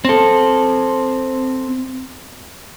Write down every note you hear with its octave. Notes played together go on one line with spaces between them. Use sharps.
C4 A4